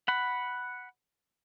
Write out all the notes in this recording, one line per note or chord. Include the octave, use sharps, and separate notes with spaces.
F#5 B5